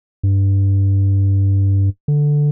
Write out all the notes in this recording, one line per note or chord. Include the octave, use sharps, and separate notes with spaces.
G2
D3